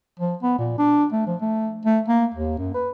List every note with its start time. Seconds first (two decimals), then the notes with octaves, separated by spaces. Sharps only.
0.20 F3
0.42 B3
0.58 A#2
0.78 D4
1.13 A3
1.27 F3
1.41 A3
1.85 A3
2.08 A#3
2.34 D#2
2.58 F#2
2.74 B4